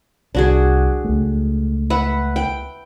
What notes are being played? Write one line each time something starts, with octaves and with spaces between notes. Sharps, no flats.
C2 D4 F#4 G#4
C#2 A3
B4 E5 F#5
G5